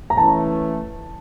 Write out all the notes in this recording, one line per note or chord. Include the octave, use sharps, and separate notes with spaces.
A#5
E3 A3 C#4 A5